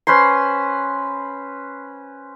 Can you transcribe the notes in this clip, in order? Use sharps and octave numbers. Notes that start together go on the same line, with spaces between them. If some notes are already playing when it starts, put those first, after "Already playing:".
C#4 B4 C5 C6